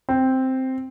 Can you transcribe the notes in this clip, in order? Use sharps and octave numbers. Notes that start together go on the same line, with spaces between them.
C4